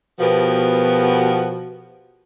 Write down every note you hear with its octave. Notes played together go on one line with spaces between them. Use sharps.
B2 F3 B3 F#4 G4 A#4